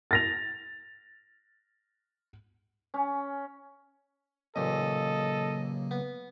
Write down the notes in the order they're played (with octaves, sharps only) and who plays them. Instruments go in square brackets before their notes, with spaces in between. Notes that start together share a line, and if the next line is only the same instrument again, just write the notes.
[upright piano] A6 A#6 F7
[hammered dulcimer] C#4
[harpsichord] A1 A#2 [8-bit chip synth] C#3 F#3 A#3 [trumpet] A4 [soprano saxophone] D#5
[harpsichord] B3